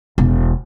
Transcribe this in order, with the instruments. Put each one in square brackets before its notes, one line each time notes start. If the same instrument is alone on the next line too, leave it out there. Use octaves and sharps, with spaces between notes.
[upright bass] E1